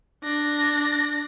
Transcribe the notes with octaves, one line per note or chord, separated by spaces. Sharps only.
D4 A#6